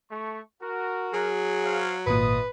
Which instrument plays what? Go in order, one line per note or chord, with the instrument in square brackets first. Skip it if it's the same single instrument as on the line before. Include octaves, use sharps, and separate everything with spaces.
[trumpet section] A3 C#6
F#4 A#4
[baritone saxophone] F#3 [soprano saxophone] G#4
[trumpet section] C5 C#5 F5
[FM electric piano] G#1 A#2 [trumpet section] F4 D#5 D#6 [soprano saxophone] B4